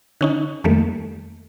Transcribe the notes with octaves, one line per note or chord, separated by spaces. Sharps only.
D3 C#4 D#4
F2 D#3 G3 A3 A#3